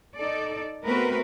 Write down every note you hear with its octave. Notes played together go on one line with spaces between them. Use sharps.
D#4 A4 D5
A3 B3 C4 F#4 A#4 B4